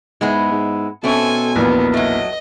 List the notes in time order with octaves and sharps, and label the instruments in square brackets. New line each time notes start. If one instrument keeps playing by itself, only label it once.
[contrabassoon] G#2 [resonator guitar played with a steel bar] G#3 B3 E4
[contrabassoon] G#2
[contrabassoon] B2 [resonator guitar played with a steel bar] A3 C4 C#4 [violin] A4 G#5
[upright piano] A#1 E2 A#2 [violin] B3
[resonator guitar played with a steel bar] F#3 A3 [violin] D#5